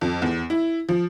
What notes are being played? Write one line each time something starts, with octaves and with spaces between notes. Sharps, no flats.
F2
E2
E4
F3